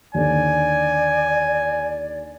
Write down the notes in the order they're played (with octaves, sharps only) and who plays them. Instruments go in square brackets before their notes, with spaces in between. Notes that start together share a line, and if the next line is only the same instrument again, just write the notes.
[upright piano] D#2 D3 [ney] D5 [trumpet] G#5